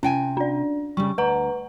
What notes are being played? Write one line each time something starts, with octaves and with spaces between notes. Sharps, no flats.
C3 C#4 G5 G#5
D4 D5
C#3 G3 C#6
D2 B4 F#5 A#5